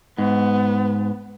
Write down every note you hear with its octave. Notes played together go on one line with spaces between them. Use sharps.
G#2 B3